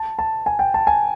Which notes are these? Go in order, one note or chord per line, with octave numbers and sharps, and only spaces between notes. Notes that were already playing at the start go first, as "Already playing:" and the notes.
Already playing: A5
A5
G#5
G5
A5
G#5